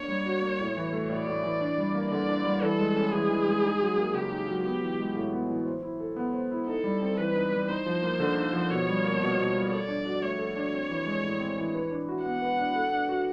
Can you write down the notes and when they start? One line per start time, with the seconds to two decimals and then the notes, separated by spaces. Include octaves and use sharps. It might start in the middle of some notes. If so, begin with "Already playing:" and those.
Already playing: A#3 D4 C#5
0.08 G3
0.26 F#4
0.42 A#3
0.59 A2
0.77 E3
0.93 A3
1.10 A2 D5
1.27 A2
1.43 E3
1.61 D4
1.78 G3
1.95 A#3
2.12 D3 D5
2.29 D4
2.45 G3
2.62 E3 A4
2.79 G#3
2.96 C#4
3.12 E3 G#4
3.30 E3
3.46 G#3
3.64 D#4
3.80 F#3
3.97 A#3
4.14 C#3 G4
4.32 D#4
4.48 F#3
4.64 B3 G4
4.81 E3
4.99 G#3
5.15 A2
5.33 B3
5.49 E3
5.66 C5
5.83 E4
6.00 A4
6.16 B3
6.33 C5
6.51 E4
6.67 D#4 A4
6.84 G3
7.02 C4
7.18 E3 B4
7.35 D#4
7.52 G3
7.68 D#4 C5
7.86 F3
8.03 A#3
8.20 D3
8.37 D#4
8.53 F3
8.71 B2 C#5
8.87 G3
9.04 A#3
9.21 B2
9.37 B2
9.55 G3
9.71 A4 D5
9.88 D4
10.06 F#4
10.22 A3 C#5
10.39 A4
10.56 D4
10.73 C4
10.89 E3
11.06 G#3
11.24 A2
11.40 C4
11.58 E3
11.74 B4
11.91 D4
12.09 F#4
12.24 B3 F#5
12.42 B4
12.59 D4
12.75 A4
12.93 D4
13.09 F#4